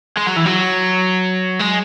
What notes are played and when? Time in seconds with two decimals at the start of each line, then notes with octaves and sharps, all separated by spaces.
0.18 G#3
0.27 F#3
0.37 E3
0.46 F#3
1.60 G#3